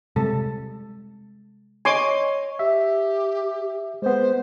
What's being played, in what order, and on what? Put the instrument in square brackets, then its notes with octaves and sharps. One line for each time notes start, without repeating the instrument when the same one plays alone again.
[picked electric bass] C3 G3 G#3 [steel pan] A4
[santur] C#5 D#5 [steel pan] G#5 C6 D6
[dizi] G4 [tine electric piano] E5
[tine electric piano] G#3 B3 [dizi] C5